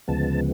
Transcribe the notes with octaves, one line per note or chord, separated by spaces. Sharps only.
D2 C#3 F3 G#3 B3 A5